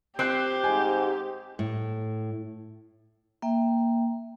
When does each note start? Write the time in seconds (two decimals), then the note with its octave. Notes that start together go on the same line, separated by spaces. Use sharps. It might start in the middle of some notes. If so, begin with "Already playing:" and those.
0.19 C4 G4 F#6 G6 C7
0.64 G#2 G#5
1.59 A2
3.42 A#3 E5 G5